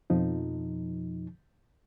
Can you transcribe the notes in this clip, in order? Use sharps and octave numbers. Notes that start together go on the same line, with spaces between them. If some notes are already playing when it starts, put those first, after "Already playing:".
F2 B2 F3 D#4